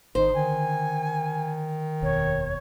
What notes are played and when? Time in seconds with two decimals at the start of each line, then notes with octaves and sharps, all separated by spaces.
0.15 G#1 D#3 D#4 C5
0.33 D3 D#3 G#5
2.02 F1 D#2 B2 C#5